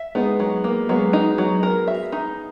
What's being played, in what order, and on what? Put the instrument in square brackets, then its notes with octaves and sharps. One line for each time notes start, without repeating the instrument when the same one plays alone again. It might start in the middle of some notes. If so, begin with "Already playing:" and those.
Already playing: [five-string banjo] E5
[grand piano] G#3 B3 [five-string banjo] D#4
[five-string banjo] F#3
A#3
[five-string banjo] F#3 [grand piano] G#3 B3
[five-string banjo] D#4
F#3
A#4
E5
D#4